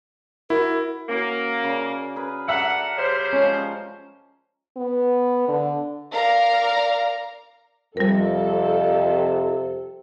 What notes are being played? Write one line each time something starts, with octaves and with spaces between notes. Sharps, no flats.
E4 F#4 A#4
A#3 C#4 F#4
C#3 D5
G#4 A#4 B4
A4 A#4 D5 E5 F#5
C#3 G3 C5
F3 G#3 C#4
B3
D3
A#4 D5 F5 A#5
F2 C3 G3 A4 A#4